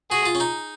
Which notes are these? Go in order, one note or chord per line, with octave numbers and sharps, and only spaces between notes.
F#4 G#4
F4
C#4
D#4